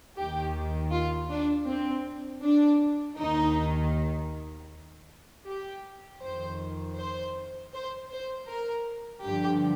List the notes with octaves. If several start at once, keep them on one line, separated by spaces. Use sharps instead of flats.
D#2 D#3 G4
F4
D4
C4
D4
D#2 D#3 D#4
G4
F2 D#3 C5
C5
C5
C5
A#4
G2 D3 F3 G4